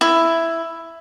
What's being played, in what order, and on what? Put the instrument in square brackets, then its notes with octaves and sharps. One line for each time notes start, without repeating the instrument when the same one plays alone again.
[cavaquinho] E4